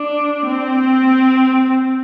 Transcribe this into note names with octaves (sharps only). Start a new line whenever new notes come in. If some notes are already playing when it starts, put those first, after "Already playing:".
Already playing: D4
C4